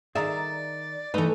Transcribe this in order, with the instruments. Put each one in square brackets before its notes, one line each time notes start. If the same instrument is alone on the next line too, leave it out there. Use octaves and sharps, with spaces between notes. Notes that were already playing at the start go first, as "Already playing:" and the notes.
[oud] D#3 E5 [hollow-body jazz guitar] G#4 A#5 [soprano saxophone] D5
[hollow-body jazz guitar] E3 B4 [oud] A3 A4 [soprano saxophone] D#4